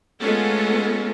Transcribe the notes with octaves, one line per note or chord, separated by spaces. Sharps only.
G#3 A3 B3 C#4 F4 A4